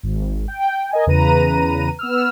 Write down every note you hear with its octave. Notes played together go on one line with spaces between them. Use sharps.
G#1
G5
A#4 D#5 G#5
E2 C#3 B4 A#5 D#7
B3 E6 F6